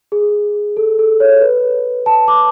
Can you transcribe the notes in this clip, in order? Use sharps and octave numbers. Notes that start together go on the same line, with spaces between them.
G#4
A4
A4
C#5
B4
A5
D6